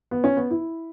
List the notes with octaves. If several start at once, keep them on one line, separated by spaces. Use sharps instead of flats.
B3
C#4
B3
E4